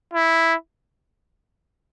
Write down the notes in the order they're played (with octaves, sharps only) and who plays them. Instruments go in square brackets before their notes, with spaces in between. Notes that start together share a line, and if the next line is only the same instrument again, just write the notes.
[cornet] E4